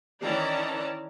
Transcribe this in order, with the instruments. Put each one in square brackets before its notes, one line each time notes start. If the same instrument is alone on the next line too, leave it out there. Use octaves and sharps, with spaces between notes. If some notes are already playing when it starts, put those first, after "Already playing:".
[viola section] D#3 E3 C#4 D5 A5 A#5